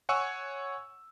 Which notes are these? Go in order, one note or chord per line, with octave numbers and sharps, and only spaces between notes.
C#5 F#5 G#5 C#6 E6